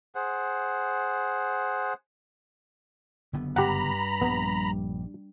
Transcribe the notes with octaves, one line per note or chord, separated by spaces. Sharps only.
G#4 C5 F#5
F#1 D3 B3
G2 G4 F#5 A#5 B5
A#1 G3 B3